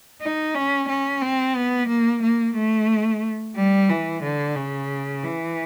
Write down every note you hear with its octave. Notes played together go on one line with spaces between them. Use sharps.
D#4
C#4
C#4
C4
B3
A#3
A#3
A3
G3
E3
D3
C#3
E3